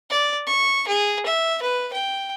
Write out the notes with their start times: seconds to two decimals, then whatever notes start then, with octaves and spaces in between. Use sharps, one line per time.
0.10 D5
0.47 C#6
0.88 G#4
1.26 E5
1.62 B4
1.93 G5